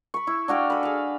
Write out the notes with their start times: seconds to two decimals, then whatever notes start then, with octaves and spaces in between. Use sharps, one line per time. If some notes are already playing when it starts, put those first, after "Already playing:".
0.14 B5 C#6
0.27 E4
0.48 D4 F#4 F5 G5
0.70 A4 G#5 B5
0.83 G#4 F5